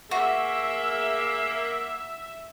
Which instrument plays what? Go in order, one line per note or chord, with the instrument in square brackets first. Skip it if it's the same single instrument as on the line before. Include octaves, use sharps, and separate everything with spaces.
[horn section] A#3 [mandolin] F#4 [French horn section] G#4 [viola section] E5